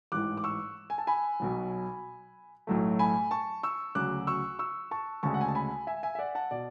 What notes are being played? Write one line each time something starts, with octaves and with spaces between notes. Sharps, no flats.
A1 G#2 E3 D6 F#6
D6
C#6 E6
G#5
A5
G#5 B5
B1 B2 F#3
B1 A2 F#3 A3
G#5 B5
A5 C#6
C#6 E6
D2 C#3 F#3 D6 F#6
C#6 E6
C#6 E6
A5 C#6
D2 C#3 G#3 A5 C#6
F#5
G#5
A5
G#5 B5
E5 G#5
E5 G#5
E5
D5 F#5
F#5 A5
B2 D5